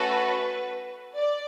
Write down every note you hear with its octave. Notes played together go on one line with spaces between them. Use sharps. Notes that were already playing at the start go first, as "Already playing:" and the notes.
Already playing: A3 C#4 F#4 A4 B4
D5